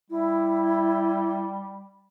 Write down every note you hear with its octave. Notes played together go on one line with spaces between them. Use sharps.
G3 E4